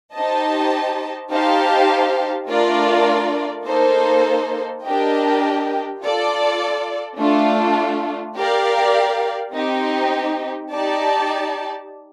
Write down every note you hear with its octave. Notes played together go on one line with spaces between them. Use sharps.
D#4 G4 C5 D#5 A5
D#4 G4 C5 F5 A5
A3 D4 F4 A#4 D5
A#3 D#4 A4 C5
D4 G4 A#4 D#5 G5
F4 A4 D5
A3 D4 F4
G4 A#4 D5 F5
C4 D#4 G4
D#4 G4 D5 A5